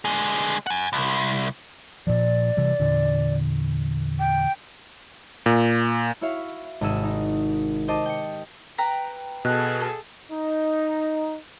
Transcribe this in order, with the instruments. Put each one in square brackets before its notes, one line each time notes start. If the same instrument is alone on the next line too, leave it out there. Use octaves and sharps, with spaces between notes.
[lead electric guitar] D3 G#3
F#5 G#5
C2
[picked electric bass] A#2 F3 [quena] D5
[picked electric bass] C3 E3 G3
E2 A#2 D3
[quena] G5
[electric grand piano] A#2
[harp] E4 F#4 C#5 E5 F5
G#1 C3 G#4 E6
D#4
G4 C5 D#5 A5 D6
G5 C#7
[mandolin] B4 G5 A#5
[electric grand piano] B2 [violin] G#4 A4 [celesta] D#5 F#6
[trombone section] D#4